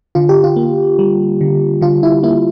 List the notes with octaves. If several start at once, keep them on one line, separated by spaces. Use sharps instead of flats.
D3 F4
G4
F4
A#3
G3
D3
D3 F4
E4
A#3 E4